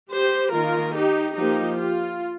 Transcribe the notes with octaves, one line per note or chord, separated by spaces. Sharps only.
G4 C5
D#3 A#3 F4 A#4
D#4 G4
F3 A#3 D#4 G4
F4